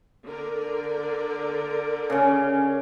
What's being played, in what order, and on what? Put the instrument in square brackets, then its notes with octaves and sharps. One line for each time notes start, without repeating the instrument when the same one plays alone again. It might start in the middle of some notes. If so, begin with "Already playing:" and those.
[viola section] D3 A#4 D5
[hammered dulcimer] C#3 C#4